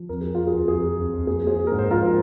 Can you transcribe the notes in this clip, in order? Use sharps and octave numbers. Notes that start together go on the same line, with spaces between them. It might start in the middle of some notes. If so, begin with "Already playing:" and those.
Already playing: F3
F2 A#4
C4 G#4
C4 F4
G#4
F2
F2 G#4
F3
F2
F2
A#3 G#4
A#3 G#4 C5
A#3
G#2 A#4
C5
G#2 F4 A#4
F3